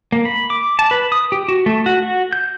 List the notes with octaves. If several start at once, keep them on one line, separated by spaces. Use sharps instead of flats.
A#3
B5
D6
A5
B4
D#6
G4
F#4
A3
F#4
F#4
G6